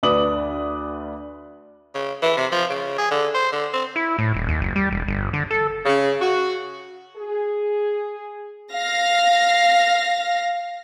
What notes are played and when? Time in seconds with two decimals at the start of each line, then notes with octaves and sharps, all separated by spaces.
0.03 D2 D4 B4 D6 D#6 F#7
1.95 C#3
2.22 E3
2.37 C3
2.52 F3
2.70 C#3
2.98 G#4
3.11 D3
3.35 C5
3.52 D3
3.74 C4
3.96 E4
4.18 A2
4.34 D#1
4.48 D#2
4.61 F#1
4.76 G3
4.91 E1
5.08 G1
5.33 D3
5.51 A4
5.85 C#3
6.20 F#4
7.17 G#4
8.73 F5 A#6